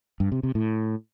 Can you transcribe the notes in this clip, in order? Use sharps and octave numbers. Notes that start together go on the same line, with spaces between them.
G2
C3
C3
A2